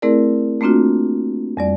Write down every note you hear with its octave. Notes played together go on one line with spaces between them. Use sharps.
A3 C4 E4 G#4 A#4 D5
A3 A#3 C4 D4 F4 F#4
F2 G3 D5